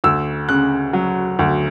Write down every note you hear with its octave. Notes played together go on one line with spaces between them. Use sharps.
D2 E6
C#3 F#6
F#3
D2